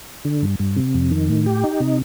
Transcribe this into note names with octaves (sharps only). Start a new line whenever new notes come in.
D3
G2
G2
C3
F2
D#3
A2
G4
D#4
C3